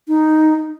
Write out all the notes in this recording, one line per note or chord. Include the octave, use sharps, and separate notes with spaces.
D#4